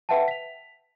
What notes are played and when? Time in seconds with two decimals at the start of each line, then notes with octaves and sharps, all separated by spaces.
0.09 B4 E5 F#5 G5 A5
0.28 B6 F7